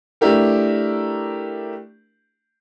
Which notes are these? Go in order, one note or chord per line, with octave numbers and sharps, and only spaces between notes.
A3 D4 E4 G4 A#4